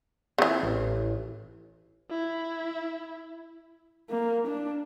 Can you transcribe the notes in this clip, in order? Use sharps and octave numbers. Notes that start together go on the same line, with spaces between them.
C#3 E3 C4 F4
A1
E4
A#3
D4